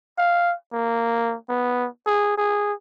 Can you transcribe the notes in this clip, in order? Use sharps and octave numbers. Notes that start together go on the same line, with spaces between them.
F5
A#3
B3
G#4
G#4